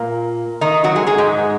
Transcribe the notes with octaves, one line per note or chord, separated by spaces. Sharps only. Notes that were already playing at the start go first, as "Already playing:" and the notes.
Already playing: A#2 A#3
D#3 D#4
F#3 F#4
G#3 G#4
G#3 G#4
G#2 G#3